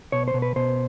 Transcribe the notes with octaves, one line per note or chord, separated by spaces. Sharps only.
B2 C#5
C5
B2
B4
B2 C5